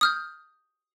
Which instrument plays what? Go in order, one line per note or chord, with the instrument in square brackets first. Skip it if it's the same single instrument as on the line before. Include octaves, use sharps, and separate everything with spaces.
[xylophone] D#6 F6 G6